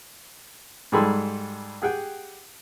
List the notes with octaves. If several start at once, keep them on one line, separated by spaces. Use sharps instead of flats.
G#2 G3 G#4 A4 B5 C6
G4 G#4 F#5 G5